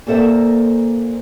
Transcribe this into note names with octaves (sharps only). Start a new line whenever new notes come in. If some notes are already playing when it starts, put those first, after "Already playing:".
A#2 A#3 A4 C5 E5 F#5